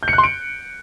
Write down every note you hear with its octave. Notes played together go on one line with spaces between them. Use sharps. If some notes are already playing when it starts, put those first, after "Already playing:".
G6
C#7
F#6
C6
D7